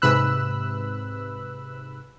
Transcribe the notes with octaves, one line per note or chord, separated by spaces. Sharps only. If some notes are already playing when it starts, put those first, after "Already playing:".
G#2 C3 B4 B5 E6 F#6